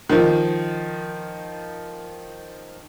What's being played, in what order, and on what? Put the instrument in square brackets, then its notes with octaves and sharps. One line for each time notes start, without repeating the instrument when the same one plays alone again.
[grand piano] D#3 F3